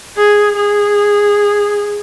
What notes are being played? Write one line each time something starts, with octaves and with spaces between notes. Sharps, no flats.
G#4
G#4